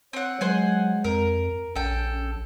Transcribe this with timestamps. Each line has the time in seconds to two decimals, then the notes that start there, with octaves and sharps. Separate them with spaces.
0.13 C4 C#5 F#5
0.41 F#3 G#3 C5 F#5 G#5
1.04 F2 A#4
1.76 A#1 C#4 A4 G5